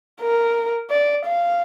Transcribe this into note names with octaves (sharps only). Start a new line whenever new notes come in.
A#4
D5
F5